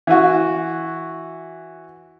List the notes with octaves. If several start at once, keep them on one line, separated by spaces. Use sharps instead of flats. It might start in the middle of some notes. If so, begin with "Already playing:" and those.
E3 F#4